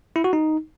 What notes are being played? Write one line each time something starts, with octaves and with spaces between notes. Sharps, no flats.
E4
F#4
D#4